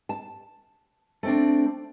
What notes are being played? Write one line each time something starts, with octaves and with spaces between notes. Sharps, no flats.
A5
A3 C4 D4